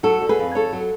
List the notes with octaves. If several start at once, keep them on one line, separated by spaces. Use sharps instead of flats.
F#3 F#4 A4
D3
G#4 B4
F2
F2 A4 C#5
F#3